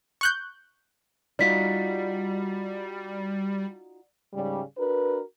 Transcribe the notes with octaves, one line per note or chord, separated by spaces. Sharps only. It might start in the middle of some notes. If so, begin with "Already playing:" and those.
C#6 F#6 G6
G3 D#4 F4 F#4 D5 B6
G#2 C#3 G3
D4 F#4 A#4 B4